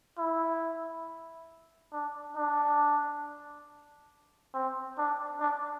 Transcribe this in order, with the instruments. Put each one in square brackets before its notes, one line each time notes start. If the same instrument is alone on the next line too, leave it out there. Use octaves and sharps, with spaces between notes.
[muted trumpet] E4
D4
D4
C4
D4
D4